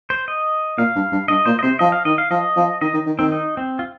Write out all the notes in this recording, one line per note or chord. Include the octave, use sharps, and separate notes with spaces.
C5
D#5
A#2 F5
G2
G2
G2 D#5
A#2 C5
D#5
C3 C5
F3 D#5
F5
D#3 D#5
F5
F3 D#5
F3
D#3 D#5
D#3
D#3
D#3 C4
D#4
C4
F4